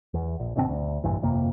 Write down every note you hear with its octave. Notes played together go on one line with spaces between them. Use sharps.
E2
A#1
F#1 B2 D3 C4
D2
F1 A#1 G2 E3
G1 F2 C3 A#3